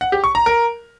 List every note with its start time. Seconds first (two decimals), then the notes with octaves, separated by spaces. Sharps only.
0.01 F#5
0.12 G4
0.24 C#6
0.35 A#5
0.46 A#4